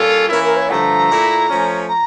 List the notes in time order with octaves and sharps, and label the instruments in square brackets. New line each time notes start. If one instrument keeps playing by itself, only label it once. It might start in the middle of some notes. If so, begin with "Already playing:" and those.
Already playing: [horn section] A#2 G3 A#3 C#4 F4 [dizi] A4
[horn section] E3 A#3 C#4 E4 [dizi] A#4
[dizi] A#4
C#5
[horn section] G2 D3 F3 A3 [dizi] A#5
[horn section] A#2 A3 E4
F3 A3 C#4
[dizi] A#5